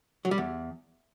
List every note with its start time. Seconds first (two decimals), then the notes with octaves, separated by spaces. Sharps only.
0.25 F#3
0.31 G3
0.38 E2